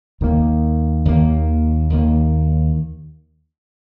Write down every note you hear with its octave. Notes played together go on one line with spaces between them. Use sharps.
D#2 D#3 A#3
D#2 D#3 A#3
D#2 D#3 A#3